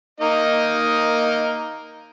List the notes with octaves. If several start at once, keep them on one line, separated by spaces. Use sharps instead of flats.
A#3 D#4 D#5